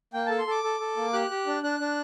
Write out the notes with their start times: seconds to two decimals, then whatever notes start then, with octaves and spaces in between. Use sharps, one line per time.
0.13 A#3 G5
0.26 A4 A5
0.38 C6
0.47 A4 D6
0.64 A4
0.80 A4
0.97 A#3
1.13 G4 F#6
1.30 G4
1.47 D4
1.63 D4 F#6
1.80 D4